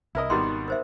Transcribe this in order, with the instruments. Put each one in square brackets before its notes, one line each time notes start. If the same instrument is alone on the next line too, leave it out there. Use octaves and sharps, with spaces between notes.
[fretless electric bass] C2 [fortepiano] E4 A#4 D#5
[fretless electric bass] G#1 [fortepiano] B2 D#3 G3 [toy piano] C6
[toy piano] A#4 C5 E5